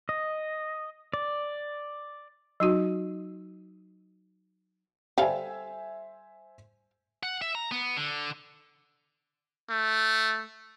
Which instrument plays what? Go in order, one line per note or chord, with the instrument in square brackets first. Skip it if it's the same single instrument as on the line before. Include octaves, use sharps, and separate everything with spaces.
[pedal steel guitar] D#5
D5
[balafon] F#3 D#4 F#4
[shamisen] G3 A4 F5 [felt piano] C5 E5 G#5
[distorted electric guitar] F#5
E5
A#5
B3
D3
[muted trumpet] A3